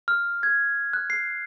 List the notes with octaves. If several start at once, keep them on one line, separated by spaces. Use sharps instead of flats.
F6
G#6
F#6
C7